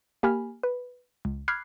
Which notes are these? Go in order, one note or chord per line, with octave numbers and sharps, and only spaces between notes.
A#3 G4 G#5 B5 F6
B4
C#2
B5 D6 F6 F#6 G#6 C7